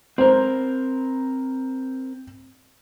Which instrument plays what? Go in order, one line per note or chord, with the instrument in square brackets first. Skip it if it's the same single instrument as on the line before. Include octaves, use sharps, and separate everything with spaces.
[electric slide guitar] C4 A#4 [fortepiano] C5